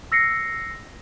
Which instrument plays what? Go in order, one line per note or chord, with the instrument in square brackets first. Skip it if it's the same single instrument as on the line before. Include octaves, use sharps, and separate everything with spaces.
[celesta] E6 A#6 C7 C#7